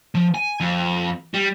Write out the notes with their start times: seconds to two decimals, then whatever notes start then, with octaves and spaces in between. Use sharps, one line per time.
0.15 F3
0.35 G#5
0.60 F2
1.34 G3